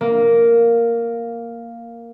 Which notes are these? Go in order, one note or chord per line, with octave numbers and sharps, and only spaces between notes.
A#3